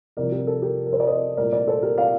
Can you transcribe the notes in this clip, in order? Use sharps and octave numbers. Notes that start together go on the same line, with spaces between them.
C2 C3 F3 C4 A#4 D5
G4 A#4
A4
G4 A#4
A#4
C5
D5
C5 D#5
C2 A#2 A3 A#4 D5
A#4 D5
A4 C5
G4 A#4
D5 F5